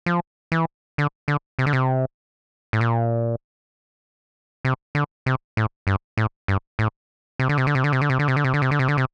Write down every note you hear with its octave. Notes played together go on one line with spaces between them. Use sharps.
F3
E3
D3
D3
C3
D3
C3
A2
A#2
C3
D3
C3
A2
G2
A2
G2
A2
C3
D3
C3
D3
C3
D3
C3
D3
C3
D3
C3
D3
C3
D3
C3
D3
C3
D3
C3